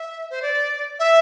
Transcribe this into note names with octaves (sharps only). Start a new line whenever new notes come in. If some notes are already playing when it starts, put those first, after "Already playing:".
Already playing: E5
C5
D5
E5